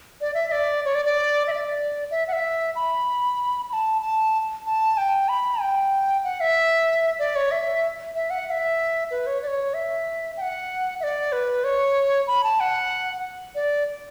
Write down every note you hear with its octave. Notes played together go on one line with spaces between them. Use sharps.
D5
E5
E5
D5
C#5
D5
D5
E5
D5
E5
F#5
E5
B5
B5
A5
A5
A5
G5
B5
G5
F#5
E5
D5
C#5
E5
E5
F#5
F#5
E5
B4
C#5
D5
C#5
E5
G5
F#5
E5
D5
B4
C#5
B5
A5
F#5
D5